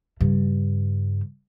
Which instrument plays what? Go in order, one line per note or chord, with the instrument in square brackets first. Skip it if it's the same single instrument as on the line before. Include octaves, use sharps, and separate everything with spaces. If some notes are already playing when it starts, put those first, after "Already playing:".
[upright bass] G2 C#3